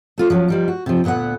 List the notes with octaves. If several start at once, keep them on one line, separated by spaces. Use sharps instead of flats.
A3 F4 C5
F3 F#3 C#4
F3 G3 D#4
F#4
C3 F3
D2 A#2 B3 B4 F#5